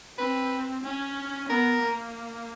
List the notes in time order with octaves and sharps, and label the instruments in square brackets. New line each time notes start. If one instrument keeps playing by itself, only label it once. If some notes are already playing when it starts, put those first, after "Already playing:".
[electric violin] C4 [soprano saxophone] B4
[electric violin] C#4
[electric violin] B3 [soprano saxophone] A#4
[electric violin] A#3